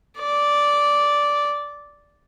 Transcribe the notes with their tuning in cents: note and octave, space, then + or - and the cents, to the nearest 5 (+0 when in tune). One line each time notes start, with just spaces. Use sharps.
D5 -5